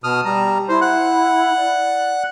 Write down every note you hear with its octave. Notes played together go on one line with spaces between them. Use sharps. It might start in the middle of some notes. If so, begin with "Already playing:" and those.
B2 A5 D#6 F6
G3 A#5
E4 C5
F#5 F#6
D5